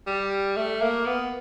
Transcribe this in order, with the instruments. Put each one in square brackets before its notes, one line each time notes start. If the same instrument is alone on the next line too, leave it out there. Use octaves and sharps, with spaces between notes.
[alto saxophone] G3
A3
A#3
B3